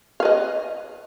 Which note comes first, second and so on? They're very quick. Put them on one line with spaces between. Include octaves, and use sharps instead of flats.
F5 B4 D#5